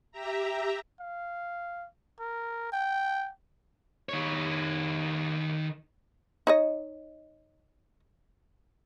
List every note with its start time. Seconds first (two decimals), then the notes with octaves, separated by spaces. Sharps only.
0.12 G4 E5 A#5
1.00 F5
2.20 A#4
2.72 G5
4.09 D#3 C#5
6.47 D#4 C#5 D#5